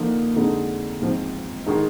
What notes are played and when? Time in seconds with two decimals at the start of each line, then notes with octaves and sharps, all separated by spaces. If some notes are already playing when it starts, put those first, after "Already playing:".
Already playing: D3 F3 A#3 D#4
0.36 F2 D3 G#3 D#4
1.02 G#2 F3 C4
1.66 D#3 G#3 D#4